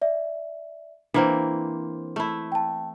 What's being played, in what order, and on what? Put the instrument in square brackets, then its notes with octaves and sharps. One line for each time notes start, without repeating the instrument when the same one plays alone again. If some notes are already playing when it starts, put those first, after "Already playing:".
[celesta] D5 E5
[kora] E3 A#3 C4 [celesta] D4 C5
[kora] A3 E4
[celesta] G5 A5